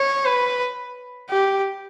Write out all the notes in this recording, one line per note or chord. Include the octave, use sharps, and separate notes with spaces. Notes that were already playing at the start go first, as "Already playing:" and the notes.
Already playing: C#5
B4
G4